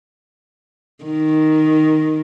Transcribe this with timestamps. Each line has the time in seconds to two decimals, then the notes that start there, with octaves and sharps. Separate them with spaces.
1.04 D#3